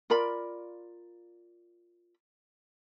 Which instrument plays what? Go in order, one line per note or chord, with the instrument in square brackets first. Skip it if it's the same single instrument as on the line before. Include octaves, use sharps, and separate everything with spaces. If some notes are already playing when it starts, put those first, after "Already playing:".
[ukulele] F4 A#4 D5 B5